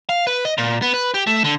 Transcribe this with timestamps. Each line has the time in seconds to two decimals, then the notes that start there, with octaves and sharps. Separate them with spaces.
0.09 F5
0.27 B4
0.45 D#5
0.58 A#2
0.82 B3
0.94 B4
1.14 G4
1.27 A3
1.44 D3